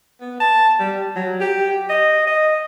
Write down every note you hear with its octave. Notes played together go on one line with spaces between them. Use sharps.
B3
A5
G3
F#3
G4
D#5
D#5